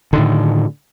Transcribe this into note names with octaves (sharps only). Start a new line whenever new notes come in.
A2 D3 D#3